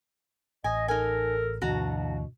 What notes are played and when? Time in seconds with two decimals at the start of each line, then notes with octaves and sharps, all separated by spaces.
0.64 A1 D#5 G#5
0.88 D#4 A4 A#4 G#5
1.62 D2 G2 B2 E3 F#4 A5 A#5